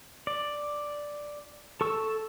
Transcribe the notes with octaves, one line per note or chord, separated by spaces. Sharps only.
D5
A4 C#6 E6